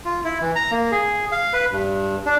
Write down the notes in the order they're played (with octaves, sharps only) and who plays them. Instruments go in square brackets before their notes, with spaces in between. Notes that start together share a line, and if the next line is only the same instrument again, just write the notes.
[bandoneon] F4
E4
E3
A#5
A#3
G#4
F5
B4
G2
D4